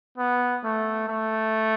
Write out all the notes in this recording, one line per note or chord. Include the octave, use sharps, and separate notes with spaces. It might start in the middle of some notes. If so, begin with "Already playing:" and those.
B3
A3
A3